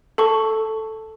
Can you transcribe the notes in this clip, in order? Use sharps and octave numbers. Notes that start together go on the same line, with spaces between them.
A4 A5 C#6